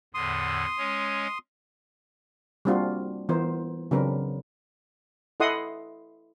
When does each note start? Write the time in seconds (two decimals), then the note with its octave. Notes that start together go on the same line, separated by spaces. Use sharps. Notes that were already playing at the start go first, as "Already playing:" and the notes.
0.14 E2 A2 D3 C6 D#6
0.78 G#3 C#4 C#5
2.65 G3 A#3 C4 D4 F4 F#4
3.29 E3 B3 F4 A#4 C5
3.91 C#3 F#3 C4 D4 A#4 B4
5.40 E4 A4 D#5 F#5 C6 D#6